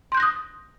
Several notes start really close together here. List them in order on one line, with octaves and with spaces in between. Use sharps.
C6 G6 F#6 A#6 D#6